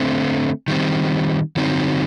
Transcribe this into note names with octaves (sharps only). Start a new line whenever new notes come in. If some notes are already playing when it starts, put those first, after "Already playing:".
Already playing: D3 A3 C4
D#3 G3 C4
D3 F#3 C4 D#4